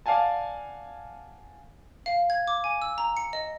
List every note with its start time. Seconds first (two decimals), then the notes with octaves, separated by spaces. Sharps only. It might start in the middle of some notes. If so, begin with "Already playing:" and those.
0.06 D5 F5 F#5 G#5 A5
2.06 F5
2.30 G#6
2.47 D6
2.64 G#5
2.82 E6
2.98 A#5
3.17 C#7
3.33 D#5